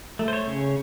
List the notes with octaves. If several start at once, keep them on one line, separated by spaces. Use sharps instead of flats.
A3
C5
C#5
C#3